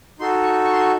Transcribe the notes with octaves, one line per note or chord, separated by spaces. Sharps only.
D#4 F#4 A4 C6
C#6
C#6
C6
C#6